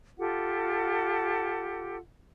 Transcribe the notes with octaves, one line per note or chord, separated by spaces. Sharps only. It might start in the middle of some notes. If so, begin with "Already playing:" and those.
F4 G4 A4 F#5